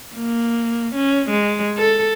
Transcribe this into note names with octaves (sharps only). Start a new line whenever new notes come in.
A#3
C#4
G#3
A4